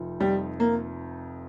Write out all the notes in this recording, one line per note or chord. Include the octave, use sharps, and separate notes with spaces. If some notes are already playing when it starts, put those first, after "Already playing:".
Already playing: F1 F2 F3 D#4
F1 F2 F3 G3 D#4
A#3